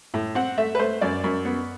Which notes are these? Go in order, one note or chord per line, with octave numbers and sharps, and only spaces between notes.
A2
C4 F#5
A3 E5
B4
A3 C5
F#2 D5
F#2
B3